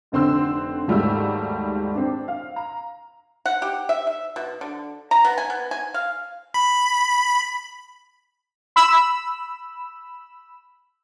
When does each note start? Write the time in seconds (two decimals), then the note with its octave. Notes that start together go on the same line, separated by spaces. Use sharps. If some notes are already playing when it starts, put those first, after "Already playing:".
0.12 F1 D3 C4 C6 E6
0.88 D#2 G#2 G3 A3 F#4 E6
1.94 C4 D4
2.28 F5
2.56 A#5
3.46 F#5
3.62 G4
3.89 E5
4.07 E5
4.36 B2
4.61 D3
5.11 A#5
5.25 B3
5.38 G#5
5.50 B3
5.71 G#5
5.94 F5
6.54 B5
8.76 B5 E6